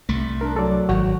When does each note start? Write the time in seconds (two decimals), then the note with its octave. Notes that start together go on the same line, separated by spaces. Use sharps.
0.09 C2 A3
0.41 D4 A#4
0.56 F#3 A4 D5
0.89 G#1 F#4